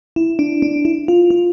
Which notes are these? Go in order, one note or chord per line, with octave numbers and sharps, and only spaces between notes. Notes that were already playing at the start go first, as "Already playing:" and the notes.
E4
D4
D4
E4
F4
F4